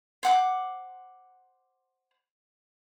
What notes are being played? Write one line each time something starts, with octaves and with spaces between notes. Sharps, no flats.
C5 F#5 D6